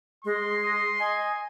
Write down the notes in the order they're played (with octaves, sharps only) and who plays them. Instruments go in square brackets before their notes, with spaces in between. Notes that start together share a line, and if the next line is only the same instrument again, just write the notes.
[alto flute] G#3 [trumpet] C6
[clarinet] D#6
[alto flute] D#5 [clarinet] G#5